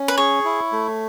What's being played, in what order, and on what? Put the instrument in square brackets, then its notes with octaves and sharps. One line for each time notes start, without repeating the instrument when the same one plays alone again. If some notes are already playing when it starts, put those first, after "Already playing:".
Already playing: [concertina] C#4
[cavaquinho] B4
[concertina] G#4 [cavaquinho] C#5
[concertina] E4
A3